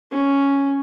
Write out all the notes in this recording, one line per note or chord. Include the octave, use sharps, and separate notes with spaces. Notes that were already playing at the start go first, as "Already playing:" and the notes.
C#4